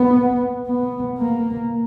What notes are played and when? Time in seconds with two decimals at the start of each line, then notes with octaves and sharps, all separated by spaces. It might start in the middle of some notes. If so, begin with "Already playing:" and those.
Already playing: B3
0.67 B3
1.19 A#3